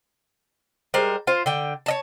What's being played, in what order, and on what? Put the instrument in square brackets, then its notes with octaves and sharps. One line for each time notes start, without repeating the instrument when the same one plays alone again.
[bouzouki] G3 G#3 A#4 C5
F4 C5
D3 G5
C#5 D#5 A5